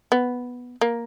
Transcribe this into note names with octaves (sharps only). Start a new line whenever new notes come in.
B3
A#3